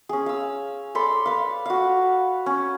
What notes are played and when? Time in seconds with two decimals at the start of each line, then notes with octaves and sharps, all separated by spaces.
0.09 C#4 G#4
0.26 F5 E6
0.95 A4 D5 B5 C6
1.25 B4 F5
1.66 F#4 F5
2.46 C#4